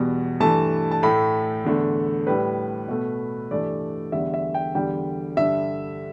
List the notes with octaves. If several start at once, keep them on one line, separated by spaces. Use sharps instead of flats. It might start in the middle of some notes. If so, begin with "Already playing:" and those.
Already playing: E2 B2 G3
G2 E3 A3 A5
A5
A2 A3 B5
E2 D3 A3
A2 G3 B4
B2 A3
G2 E3 A3 D5
E2 D3 G3 E5
E5
G5
E2 D3 G3 G5
G2 D3 G3 E5